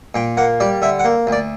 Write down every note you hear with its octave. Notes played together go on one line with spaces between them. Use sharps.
A#2 G5
A#3 F#5
G3 D5
D3 E5
F#5
A#3
D2
D5